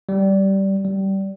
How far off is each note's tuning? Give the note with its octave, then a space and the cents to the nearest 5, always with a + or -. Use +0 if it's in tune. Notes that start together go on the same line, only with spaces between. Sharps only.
G3 -15
G3 -20